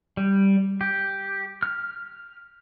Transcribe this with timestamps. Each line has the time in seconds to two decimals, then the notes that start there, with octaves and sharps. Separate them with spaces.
0.17 G3
0.81 G4
1.63 F6